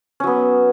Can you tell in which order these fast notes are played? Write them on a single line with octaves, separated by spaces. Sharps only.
C#4 F#3 B3